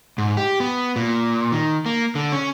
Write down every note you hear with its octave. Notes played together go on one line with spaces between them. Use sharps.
G#2
G4
B3
A#2
D#3
A#3
D3
C#4